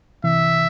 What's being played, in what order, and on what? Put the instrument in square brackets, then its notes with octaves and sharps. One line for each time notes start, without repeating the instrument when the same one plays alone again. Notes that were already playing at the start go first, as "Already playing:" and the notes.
[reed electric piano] C2 C3 E3 [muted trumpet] E5